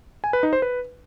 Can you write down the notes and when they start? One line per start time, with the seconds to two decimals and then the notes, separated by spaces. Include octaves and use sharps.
0.24 G#5
0.33 B4
0.43 D#4
0.53 C5
0.62 B4